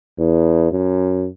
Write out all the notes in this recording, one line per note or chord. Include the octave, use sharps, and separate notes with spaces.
E2
F#2